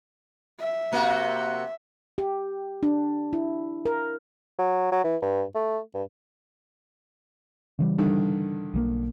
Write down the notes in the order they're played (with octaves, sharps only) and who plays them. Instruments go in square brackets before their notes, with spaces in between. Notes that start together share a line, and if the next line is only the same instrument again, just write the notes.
[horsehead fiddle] E5
[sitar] C3 A#3 F#4
[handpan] G4
D4
E4
A#4
[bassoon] F#3
F#3
E3
G2
A3
G2
[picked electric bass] C#3 E3 G3
[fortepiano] G2 D3 D#3
[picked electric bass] B1 F3 A#3